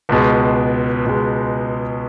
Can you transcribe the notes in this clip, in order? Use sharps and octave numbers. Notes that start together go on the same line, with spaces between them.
C#2 B2 G#3
C#2 B2 G#3